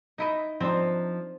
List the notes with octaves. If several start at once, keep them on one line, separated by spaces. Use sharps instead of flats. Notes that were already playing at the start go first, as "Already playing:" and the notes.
D#4 E4 D#5
F3 C4 D4 D#4 C5